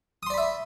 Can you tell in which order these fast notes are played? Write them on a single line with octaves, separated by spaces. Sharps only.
D#6 C6 D5 B5 E5